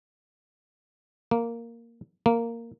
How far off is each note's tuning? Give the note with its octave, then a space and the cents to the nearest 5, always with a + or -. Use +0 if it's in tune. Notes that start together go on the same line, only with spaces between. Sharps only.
A#3 -5
A#3 -10